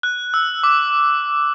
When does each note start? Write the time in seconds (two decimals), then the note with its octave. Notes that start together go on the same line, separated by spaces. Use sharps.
0.03 F#6
0.34 E6
0.63 D6